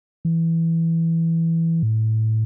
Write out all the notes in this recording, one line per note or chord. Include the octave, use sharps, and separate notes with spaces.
E3
A2